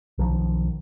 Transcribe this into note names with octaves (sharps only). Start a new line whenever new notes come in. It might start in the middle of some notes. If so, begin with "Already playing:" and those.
B1 D#3 F3